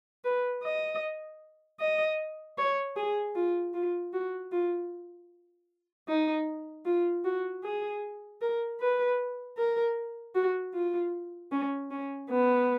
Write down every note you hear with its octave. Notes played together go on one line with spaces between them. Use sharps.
B4
D#5
D#5
C#5
G#4
F4
F4
F#4
F4
D#4
F4
F#4
G#4
A#4
B4
A#4
F#4
F4
C#4
C#4
B3